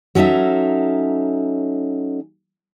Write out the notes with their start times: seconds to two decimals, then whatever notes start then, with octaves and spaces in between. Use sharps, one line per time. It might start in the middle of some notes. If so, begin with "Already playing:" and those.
0.15 F#3 C#4 D#4 A4 E5